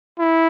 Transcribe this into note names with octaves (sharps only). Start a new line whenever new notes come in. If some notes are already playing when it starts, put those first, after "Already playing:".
E4